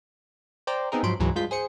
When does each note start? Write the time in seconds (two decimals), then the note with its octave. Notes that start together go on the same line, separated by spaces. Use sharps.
0.67 C5 D5 G5 A#5
0.92 B3 C4 D#4 G#4 A#4
1.03 G#2 F3 F#3 B5 C6 D7
1.19 C#2 G#2 E3 F#3 G#3
1.36 G2 G#3 F4 G6 B6
1.51 G#4 C5 C#7